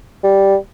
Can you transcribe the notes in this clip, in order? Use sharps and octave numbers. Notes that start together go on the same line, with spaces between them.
G3